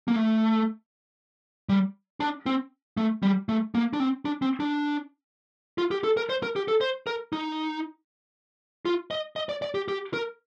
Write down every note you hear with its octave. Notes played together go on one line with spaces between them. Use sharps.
A#3
A3
G3
D4
C4
A3
G3
A3
A#3
D4
C4
D4
C4
D4
F4
G4
A4
A#4
C5
A#4
G4
A4
C5
A#4
D#4
F4
D#5
D#5
D5
D5
G4
G4
A#4